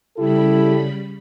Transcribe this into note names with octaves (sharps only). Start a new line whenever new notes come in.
C#3 G3 E4 G4 A4 B5